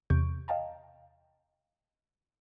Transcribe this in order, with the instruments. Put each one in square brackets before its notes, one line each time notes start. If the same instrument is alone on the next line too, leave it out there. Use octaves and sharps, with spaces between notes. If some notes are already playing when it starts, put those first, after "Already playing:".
[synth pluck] E2 C3 C#6 G6 D7
D#5 F5 G5 A5 A#5